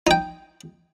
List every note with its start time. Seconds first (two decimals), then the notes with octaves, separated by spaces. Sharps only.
0.07 D#4 G5